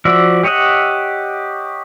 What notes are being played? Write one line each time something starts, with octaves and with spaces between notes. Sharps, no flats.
F3 F#4 D5 E5
G4 C#5 D#5 E5 F#5